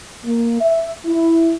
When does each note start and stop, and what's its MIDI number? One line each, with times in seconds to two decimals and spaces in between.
0.25 0.59 58
0.61 0.92 76
1.06 1.54 64